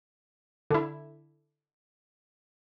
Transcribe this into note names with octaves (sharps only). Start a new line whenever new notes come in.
D3 E4